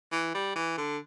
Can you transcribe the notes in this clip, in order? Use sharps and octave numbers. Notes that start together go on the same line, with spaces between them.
E3
G3
E3
D3